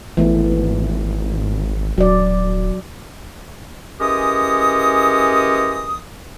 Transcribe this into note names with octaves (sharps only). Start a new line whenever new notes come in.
G#1 E3 A3 B3
D#1 F#3 D5
E3 G#3 C#4 G4 A#4 D#6